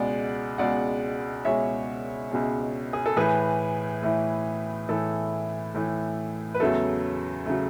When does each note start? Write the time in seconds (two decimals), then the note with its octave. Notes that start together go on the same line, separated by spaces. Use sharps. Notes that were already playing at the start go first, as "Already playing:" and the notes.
Already playing: C#2 B2 G#3 D5 F#5
0.58 C#2 B2 G#3 D5 F#5
1.45 C#2 B2 G#3 C#5 E5
2.31 C#2 B2 G#3
2.93 G#4
3.06 A4
3.17 A2 E3 A3 G#4 B4
4.03 A2 E3 A3
4.89 A2 E3 A3 A4
5.74 A2 E3 A3
6.54 B4
6.60 E2 C#3 F#3 A3 A4
7.46 C#3 F#3 A3